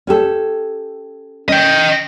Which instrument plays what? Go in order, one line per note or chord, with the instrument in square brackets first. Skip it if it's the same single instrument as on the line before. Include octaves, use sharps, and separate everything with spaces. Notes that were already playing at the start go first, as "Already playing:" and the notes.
[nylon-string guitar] C#4 G4 A4
[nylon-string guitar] C#4 [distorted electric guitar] D#5 G5